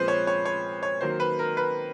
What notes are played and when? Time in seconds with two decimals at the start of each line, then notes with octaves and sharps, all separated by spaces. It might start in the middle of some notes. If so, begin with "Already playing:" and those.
Already playing: A#2 F3 G#3 C4 B4 C5
0.08 C#5
0.27 C#5
0.45 C#5
0.83 C#5
1.01 D#3 F#3 A#3 C5
1.20 B4
1.39 A#4
1.57 B4